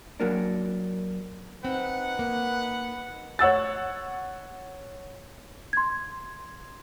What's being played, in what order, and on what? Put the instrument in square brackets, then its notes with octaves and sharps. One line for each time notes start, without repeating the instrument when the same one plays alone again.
[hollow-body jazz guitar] F#3 A#3 D4
[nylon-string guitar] C4 [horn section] D#4 B4 F#5
[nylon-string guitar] A#3
[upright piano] C#5 F#5 E6 A6
[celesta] C6 G#6